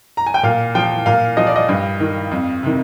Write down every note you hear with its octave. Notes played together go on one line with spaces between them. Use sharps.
A#5
G#5
G5
A#2 F5
F3 G5
A#2 F5
F3 D#5
D5
D#5
G2
D#3
F2
C3 D#3